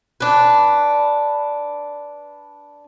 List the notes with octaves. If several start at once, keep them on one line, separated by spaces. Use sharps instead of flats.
D4 B4